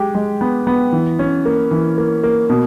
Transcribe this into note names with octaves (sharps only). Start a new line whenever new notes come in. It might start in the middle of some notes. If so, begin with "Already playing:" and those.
Already playing: G#3 G4
G#3
B3
B3
E3
C#4
A#3
E3
A#3
A#3
B2